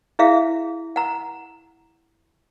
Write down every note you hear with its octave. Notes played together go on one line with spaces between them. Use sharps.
E4 G#4 E5 F5
F#5 A#5